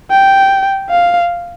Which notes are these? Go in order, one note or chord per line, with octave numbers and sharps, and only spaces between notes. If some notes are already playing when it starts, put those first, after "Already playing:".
G5
F5